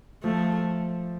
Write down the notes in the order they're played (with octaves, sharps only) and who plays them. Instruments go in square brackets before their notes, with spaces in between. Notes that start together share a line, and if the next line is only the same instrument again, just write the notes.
[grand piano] F3 [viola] A3